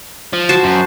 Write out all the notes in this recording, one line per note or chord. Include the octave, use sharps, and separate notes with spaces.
F3
F#4 C5 A5
F#2